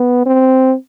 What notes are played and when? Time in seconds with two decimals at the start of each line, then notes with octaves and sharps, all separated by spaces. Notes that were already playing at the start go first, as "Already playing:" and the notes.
Already playing: B3
0.26 C4